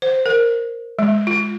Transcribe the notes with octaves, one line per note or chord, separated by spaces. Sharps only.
C5
A#4
G#3
F4